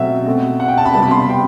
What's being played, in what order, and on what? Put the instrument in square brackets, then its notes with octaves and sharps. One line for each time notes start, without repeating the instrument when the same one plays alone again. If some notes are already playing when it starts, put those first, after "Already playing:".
Already playing: [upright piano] B2 F#3 A3 C4 E5
B2 A3 C4
F#5
G5
A5
B5
C3 G3 B3 A5
B5
C6
B5
G5